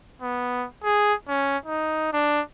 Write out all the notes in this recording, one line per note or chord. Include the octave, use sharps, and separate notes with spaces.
B3
G#4
C#4
D#4
D4